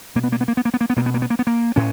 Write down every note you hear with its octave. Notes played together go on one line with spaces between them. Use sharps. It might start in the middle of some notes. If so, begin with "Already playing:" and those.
B2 A#3
B3
A#3
B3
A#3
B3
A#3
B3
A#3
B3
B2 A#3
B3
A#3
B3
A#3
B3
A#3
A2 C#4